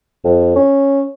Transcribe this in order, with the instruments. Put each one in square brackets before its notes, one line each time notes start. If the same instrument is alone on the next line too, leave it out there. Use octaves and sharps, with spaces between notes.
[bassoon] F2
C#4